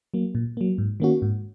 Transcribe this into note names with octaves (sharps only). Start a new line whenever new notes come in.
F#3 A#3
A#2
F#3 A#3
G#2
D#3 A#3 C#4 F#4
G#2